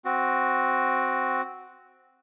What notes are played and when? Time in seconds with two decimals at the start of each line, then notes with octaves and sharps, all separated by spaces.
0.05 C4 F#4